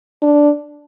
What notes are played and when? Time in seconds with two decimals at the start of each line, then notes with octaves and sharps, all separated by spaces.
0.22 D4